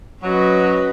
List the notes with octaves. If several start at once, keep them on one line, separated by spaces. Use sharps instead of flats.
F#3 C#4 F#4 B4 D#5